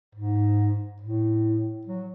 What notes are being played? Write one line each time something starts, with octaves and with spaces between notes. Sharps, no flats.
G#2
A2
F#3